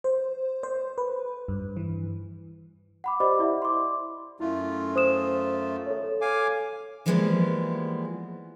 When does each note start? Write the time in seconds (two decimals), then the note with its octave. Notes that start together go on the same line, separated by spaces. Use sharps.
0.04 C5
0.63 C5
0.98 B4
1.48 G2
1.77 E3
3.04 F#5 B5 D6
3.20 G4 C5 D5 D#5 B5 D6
3.39 E4 D5 E5
3.62 C6 D6
4.40 F#2 A3 E4 F4
4.96 C5 D#6 E7
5.87 A4 C#5
6.21 F5 G#5 D6
7.06 E3 F3 G3 G#3 A#3 B3